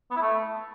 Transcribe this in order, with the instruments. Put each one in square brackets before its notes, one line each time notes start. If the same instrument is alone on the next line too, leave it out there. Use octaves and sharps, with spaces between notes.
[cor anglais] B3
E4
A3